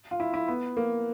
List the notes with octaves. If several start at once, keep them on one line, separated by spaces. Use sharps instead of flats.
F4
E4
E4
B3
A#3